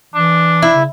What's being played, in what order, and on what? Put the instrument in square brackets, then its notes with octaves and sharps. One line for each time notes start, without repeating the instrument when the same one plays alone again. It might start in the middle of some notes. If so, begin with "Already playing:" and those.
[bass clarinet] E3 [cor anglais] D4
[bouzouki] E4
[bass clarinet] C#3